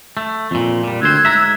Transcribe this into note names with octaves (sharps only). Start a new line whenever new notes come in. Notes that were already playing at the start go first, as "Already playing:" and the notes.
A3
F2 A#2
A#2 G3
D2 C5 E6 F#6 G#6
G#2 E5 A#5